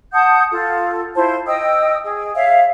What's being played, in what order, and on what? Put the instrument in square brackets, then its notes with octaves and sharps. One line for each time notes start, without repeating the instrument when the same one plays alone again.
[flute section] F#5 A5 D#6 G6
F4 A4
E4 F4 C5 A5
D#5 G5 D#6 E6
G#4
C#5 E5 F5